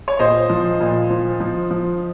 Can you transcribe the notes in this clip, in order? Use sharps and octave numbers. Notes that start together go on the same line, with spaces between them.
C#5
A#2 C5 D#5
F3
A#2
F3
F3
F3